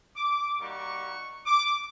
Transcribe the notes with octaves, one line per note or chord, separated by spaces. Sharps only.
D6
G3 A#3 D#4 F#4 C#6
D6